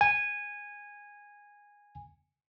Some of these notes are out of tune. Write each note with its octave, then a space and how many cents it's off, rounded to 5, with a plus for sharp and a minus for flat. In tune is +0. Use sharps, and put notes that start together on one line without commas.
G#5 -15